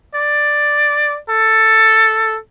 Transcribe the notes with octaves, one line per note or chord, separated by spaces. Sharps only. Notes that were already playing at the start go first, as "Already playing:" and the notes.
D5
A4